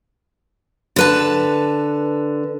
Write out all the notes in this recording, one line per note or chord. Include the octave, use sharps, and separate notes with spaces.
D3 B4 A5